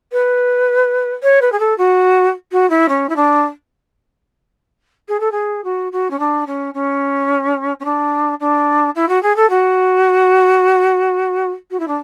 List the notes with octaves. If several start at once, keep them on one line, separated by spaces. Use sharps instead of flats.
B4
C#5
B4
G#4
A4
F#4
F#4
E4
C#4
E4
D4
G#4
A4
G#4
F#4
F#4
C#4
D4
C#4
C#4
C#4
D4
D4
E4
F#4
G#4
A4
F#4
F#4
E4
D4